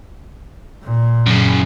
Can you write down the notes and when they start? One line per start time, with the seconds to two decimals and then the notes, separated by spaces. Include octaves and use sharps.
0.84 A#2
1.27 F#2 C#3